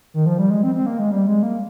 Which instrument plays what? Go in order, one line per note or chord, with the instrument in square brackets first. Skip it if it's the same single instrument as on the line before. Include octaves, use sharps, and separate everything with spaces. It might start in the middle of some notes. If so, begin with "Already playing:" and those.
[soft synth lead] D#3
F3
G3
G#3
C4
C4
A#3
G#3
G3
G#3
A#3